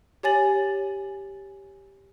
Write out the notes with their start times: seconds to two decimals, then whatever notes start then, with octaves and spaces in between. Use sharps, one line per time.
0.23 G4 C#5 G#5 A6 F#7